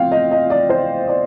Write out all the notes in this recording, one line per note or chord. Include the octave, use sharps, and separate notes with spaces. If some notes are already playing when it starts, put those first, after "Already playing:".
Already playing: A2 F3 C4 F5 G5
D#5
D#5
D5
C5
D5